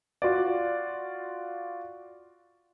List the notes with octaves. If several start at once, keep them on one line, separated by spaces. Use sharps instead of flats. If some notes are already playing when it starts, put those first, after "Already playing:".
F4 F#4 D5